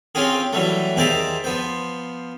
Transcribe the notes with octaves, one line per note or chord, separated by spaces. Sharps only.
C4 C#4 F4 G4 G#4
E3 F#3 G3 A3
D#2 G#4 C5 D5 E5 A#5
F3 B3 C5